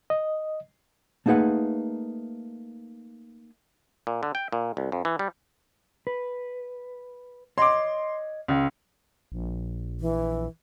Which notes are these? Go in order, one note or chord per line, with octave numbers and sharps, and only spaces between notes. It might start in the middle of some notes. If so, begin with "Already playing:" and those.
D#5
A3 A#3 D#4 G#4 B4 F#5
A#2
D3
G5
A#2
C2
F2
E3
G3
B4
C#5 D#5 C6 D6
C#2
A#1
E3